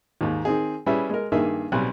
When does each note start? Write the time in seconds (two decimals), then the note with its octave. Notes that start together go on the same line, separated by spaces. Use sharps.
0.21 D#2 G#2
0.45 D#3 C4 G#4
0.86 G3 C#4 E4 G#4 B4 E5
1.10 G#3 A#4
1.32 G2 D#3 A#3 G#4 E5 D#6
1.72 B1 G3 C4 G#5 F#6